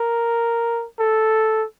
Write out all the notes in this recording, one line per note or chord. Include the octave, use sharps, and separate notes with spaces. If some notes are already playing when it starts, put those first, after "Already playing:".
Already playing: A#4
A4